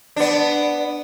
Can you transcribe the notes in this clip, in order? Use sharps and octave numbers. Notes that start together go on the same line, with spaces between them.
B3 D4